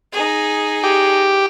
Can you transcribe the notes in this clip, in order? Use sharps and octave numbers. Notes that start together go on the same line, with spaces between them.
D#4 G#4
G4